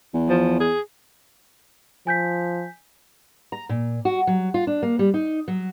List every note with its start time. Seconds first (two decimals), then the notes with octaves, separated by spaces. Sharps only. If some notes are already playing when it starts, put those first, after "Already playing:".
0.14 E2
0.29 F3
0.60 G#4
2.07 F3 G#5 G6 B6
3.52 A#5
3.69 A#2
4.05 F#4
4.27 F#3
4.54 F4
4.67 D4
4.83 A#3
4.99 G3
5.14 D#4
5.48 F#3